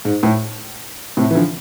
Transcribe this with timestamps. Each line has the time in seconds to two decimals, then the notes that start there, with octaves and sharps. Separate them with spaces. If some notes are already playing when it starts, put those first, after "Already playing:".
0.05 G#2
0.23 A2
1.17 A2 C3
1.31 E3
1.35 D3 F3